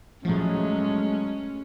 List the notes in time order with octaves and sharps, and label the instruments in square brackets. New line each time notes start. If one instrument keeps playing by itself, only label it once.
[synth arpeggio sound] A2 F3 [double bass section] F#3 G#3 A3 [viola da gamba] C#4